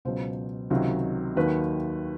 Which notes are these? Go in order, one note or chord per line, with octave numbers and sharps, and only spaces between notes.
C#2 B2 F#3 C5
C#2 C3 D#3 F#3
D#2 D#3 F#3 B4